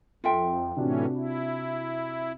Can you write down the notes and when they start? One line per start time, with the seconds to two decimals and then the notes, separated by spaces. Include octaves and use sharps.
0.24 F2 F4 A4 E5 G5
0.77 A2 C3 E3 C#4 D4 F#4
1.15 E4